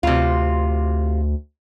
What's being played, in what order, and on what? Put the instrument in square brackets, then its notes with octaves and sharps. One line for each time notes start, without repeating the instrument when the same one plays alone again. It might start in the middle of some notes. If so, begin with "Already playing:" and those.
[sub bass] D2 [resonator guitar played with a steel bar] C3 F4